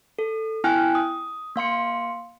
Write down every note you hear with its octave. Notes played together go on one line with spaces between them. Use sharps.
A4
B3 E4 G5 G#5 F6 F#6
D#6
A#3 F5 C6 C#7